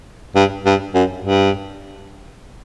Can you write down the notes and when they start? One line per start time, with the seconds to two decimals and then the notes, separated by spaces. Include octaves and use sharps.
0.35 G2
0.66 G2
0.95 F#2
1.24 G2